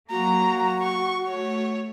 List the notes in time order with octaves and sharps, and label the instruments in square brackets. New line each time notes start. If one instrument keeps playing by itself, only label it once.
[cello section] F#3 A#3 [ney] F#4 [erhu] A#5
[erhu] C#6
[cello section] A3 [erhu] C#5